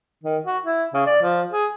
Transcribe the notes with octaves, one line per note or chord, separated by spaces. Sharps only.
D#3
F#4
E4
C#3
D5
F3
G#4